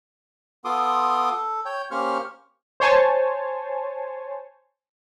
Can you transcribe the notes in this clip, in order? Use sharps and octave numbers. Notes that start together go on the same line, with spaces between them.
B3 F4 A4 C6 D6 D#6
A4
C#5 G5
A#3 C#4 G4 C5 C#6 F6
C5 C#5 G#5 A5